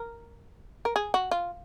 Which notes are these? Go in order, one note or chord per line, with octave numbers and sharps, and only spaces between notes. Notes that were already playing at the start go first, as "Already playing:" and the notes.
Already playing: A#4
A#4
G#4
F#4
F4